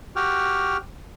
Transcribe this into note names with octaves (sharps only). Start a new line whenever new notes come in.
F#4 G4 G5 F6